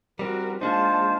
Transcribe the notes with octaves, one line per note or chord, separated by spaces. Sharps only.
G3 C4 F#4 A#4
G#3 A#3 D4 D#4 F4 C5 A5